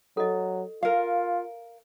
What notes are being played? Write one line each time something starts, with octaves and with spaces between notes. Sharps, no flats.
F#3 A4 D#5
F4 A#4 F5